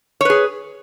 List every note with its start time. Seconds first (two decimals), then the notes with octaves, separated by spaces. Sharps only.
0.21 C#5
0.25 B4
0.30 G#4